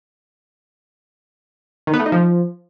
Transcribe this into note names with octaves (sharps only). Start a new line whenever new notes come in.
D#3
B3
A3
D#4
F3